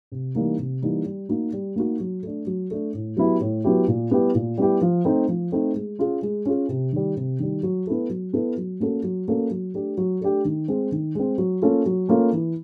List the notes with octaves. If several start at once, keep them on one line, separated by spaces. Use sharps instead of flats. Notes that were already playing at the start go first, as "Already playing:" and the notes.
C3
E3 G3 A#3 D#4
C3
E3 G3 A#3 D#4
G3
A#3 D#4 F#4
G3
A#3 D#4 F#4
F#3
A3 D4
F#3
A3 D4
A2
F#3 B3 E4 G4
A2
F#3 B3 E4 G4
A#2
G3 B3 E4 G4
A#2
G3 B3 E4 G4
F3
A3 C4 D#4
F3
A3 C4 D#4
G#3
C#4 F4 G#4
G#3
C#4 F4 G#4
C3
D#3 G3
C3
D#3 G3
F#3
B3 E4 A4
F#3
B3 E4 A4
F#3
A#3 C#4 F#4 A4
F#3
A#3 C#4 F#4 A4
F#3
A3 D4 G4
F#3
A3 D4 G4
D#3
G#3 C4
D#3
G#3 C4
F#3
A#3 C#4 F4 A4
F#3
A#3 C#4 F4 A4
E3